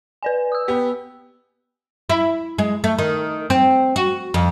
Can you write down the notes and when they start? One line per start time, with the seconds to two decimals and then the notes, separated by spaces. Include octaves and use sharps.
0.23 B4 D5 G#5
0.52 D#6 E6
0.68 B3 G4
2.09 E4
2.58 G#3
2.84 A3
2.98 D#3
3.50 C4
3.96 F#4
4.34 F2